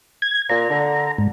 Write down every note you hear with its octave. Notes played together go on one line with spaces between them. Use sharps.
G#6
A#2 A#5
D3
G#2